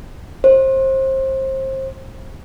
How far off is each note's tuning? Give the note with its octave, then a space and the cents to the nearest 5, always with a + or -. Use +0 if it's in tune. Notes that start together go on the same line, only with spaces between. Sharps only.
C5 +30